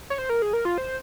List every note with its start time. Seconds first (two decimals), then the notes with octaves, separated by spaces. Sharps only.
0.10 C#5
0.18 C5
0.29 A#4
0.42 G#4
0.53 A#4
0.65 F4
0.78 C5